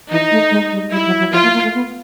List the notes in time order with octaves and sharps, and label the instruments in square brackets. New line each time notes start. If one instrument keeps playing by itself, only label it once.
[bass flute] E3 [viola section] D#4
[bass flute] A3
G#3
G3
[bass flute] G3 [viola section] E4
[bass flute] F#3
F#3
[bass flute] F3 [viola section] F4
[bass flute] A#3
A#3
A3
B3